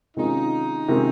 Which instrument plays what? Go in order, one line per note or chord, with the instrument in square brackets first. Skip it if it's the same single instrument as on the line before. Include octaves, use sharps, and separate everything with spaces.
[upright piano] C3 D#3 G#3 C#4 F4 [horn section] D#4
[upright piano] C3 D#3 G#3 C#4 F4